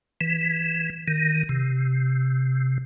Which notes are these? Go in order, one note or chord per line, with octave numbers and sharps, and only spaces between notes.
E3
D#3
C3